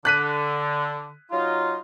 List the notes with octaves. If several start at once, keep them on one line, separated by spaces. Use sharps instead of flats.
D3 F#6 B6 D#7
F#3 D#4 F4